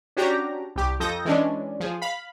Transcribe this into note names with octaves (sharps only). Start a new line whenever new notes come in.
C#4 D4 F#4 G4 A#5
C2 G4
F2 A4 D#6 G6 A#6
E3 G#3 C#4 D4
F3 G#4
F5 B5